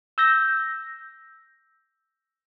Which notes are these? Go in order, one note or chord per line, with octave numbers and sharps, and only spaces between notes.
E6 G6 A#6